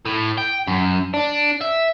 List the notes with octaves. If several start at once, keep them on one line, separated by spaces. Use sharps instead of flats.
A2
G5
F#2
D4
E5